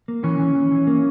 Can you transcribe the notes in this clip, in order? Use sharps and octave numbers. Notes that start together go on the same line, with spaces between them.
A#3
E3 C#4
E3
E3
E3
A#3